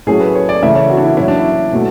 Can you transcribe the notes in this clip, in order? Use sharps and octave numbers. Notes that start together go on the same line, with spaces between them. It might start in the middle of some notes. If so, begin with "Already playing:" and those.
A2 F#3 A3 C#4 G#4
B4
C#5
D5
C#3 E3 A3 E5
C#5
F#4
D4
E4
A2 F#3 C#4 E4
D4
E4
B2 F#3 A3